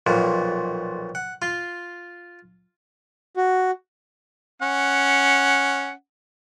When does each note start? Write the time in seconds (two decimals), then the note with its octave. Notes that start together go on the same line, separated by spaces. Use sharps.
0.07 B1 F2 A#2
1.15 F#5
1.42 F4 C6
3.37 F#4
4.62 C#4 F#5